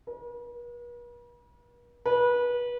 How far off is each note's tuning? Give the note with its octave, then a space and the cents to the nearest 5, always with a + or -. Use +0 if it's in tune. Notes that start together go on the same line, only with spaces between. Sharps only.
B4 -45
B4 -25